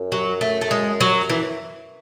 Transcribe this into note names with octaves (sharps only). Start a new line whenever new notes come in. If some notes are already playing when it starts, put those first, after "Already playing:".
Already playing: F#2
F#3
A3
A3
G#3
F#3
E3